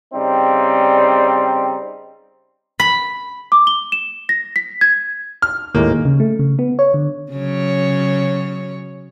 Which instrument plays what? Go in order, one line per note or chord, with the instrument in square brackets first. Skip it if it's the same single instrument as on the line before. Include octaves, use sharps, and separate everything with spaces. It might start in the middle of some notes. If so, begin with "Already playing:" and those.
[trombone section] C#3 G3 C4 D#4
[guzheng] B5
[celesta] D6
G7
E7
A#6
B6
G#6
[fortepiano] F6
[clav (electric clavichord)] D#2 A2 G#3 [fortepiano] A#3
[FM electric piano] C#3
A3
C#3
B3
C#5
D3
[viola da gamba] C#3 F#3 C#5